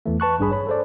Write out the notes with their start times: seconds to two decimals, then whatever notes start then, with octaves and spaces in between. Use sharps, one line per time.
0.06 E2 E3 A3
0.20 B4 A5 C#6 F#6
0.39 G#1 G2 D4 G#4 B5
0.51 C#5 B5
0.67 A4 C5 D5